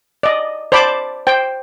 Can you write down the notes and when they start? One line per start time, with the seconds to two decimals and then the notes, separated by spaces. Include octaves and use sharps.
0.23 D5 D#5
0.72 C5 D5 A5 B5 D6
1.27 C5 G5